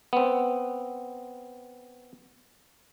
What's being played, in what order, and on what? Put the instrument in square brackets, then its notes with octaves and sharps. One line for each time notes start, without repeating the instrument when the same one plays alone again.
[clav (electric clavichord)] B3 C4